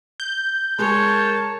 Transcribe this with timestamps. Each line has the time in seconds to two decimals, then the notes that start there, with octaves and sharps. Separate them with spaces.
0.20 G6
0.79 G#3 A#4 C#5 A5